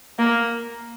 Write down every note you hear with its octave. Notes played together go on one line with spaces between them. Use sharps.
A#3